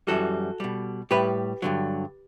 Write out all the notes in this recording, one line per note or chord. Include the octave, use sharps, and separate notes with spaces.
F#2 E3 G3 F#4 A4
B2 G3
A2 G3 G4 B4
G2 D3 F#3